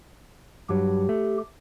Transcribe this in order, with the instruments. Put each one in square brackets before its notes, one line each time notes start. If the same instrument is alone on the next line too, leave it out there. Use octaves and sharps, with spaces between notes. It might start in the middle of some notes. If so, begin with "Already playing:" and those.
[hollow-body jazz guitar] G2 F#3 [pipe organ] G4
[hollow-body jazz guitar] A3